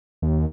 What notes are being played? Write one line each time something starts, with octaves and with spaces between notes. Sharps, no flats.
D#2